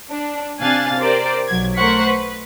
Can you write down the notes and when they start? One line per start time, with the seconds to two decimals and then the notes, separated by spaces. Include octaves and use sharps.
0.10 D4
0.60 C3 D4 F5 G#5 F#6 A6
0.98 G4 A#4 C5 D5
1.48 B1 F#3 G#6
1.76 A3 A#4 C5 F#5 C#6 B6
2.07 B4